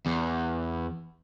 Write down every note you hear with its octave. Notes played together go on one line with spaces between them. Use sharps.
E2